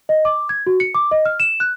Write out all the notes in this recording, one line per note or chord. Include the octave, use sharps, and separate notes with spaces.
D#5
D6
G#6
F#4
C#7
D6
D#5
F6
E7
F#6